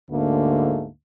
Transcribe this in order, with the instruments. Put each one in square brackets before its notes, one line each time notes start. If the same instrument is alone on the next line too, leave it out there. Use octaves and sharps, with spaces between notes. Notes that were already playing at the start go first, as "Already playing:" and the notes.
[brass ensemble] D2 G#2 D3 A3 A#3